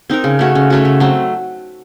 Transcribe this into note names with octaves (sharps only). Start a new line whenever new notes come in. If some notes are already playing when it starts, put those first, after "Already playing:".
C4 D#4 A#4
C#3
A3 C#4 F#4
C#3
A3 C#4 F#4
C#3
F#3 A3 C4